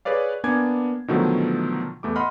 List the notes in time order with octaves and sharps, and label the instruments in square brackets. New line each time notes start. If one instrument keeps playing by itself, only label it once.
[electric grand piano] G#4 B4 C#5 D5 F5
A#3 B3 D4 G#5 D6 G#6
B2 D3 D#3 F3 F#3 A3
E2 A3 E4 D6
D#5 F#5 B5 C6 F6